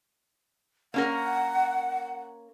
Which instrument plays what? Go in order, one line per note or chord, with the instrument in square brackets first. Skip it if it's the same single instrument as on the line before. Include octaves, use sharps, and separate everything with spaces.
[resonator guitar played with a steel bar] A#3 C#4 A#4 [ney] F#5